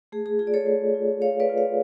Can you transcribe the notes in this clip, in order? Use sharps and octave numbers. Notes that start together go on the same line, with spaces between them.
A3 G#4
G#4
F4 G#4
D5
A4 C#5
A3
F4
A3 C#5 F5
B4 D5
F4
C#5 F5